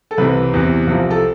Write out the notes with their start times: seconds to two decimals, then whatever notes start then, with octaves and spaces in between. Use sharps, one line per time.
0.11 A4
0.18 C2 C3 E3 B4
0.53 E2 C3 E3
0.87 C2 C3 F3
1.10 A4